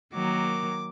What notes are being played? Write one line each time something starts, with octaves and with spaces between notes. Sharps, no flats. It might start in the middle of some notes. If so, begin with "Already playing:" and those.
D#3 F#3 A#3 D6